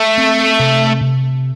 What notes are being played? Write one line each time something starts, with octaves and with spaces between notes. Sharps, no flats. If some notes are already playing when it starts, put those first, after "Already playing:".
Already playing: A3
C4
C3
C3